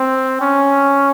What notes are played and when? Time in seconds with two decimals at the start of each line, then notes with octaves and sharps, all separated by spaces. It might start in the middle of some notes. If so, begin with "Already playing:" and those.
Already playing: C4
0.41 C#4